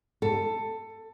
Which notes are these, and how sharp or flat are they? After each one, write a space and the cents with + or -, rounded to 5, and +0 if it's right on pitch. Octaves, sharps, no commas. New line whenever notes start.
A4 +15